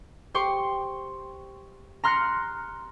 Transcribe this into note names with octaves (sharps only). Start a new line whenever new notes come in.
G4 C5 C6 C#6
A#5 C6 F6 F#6 A#6 C#7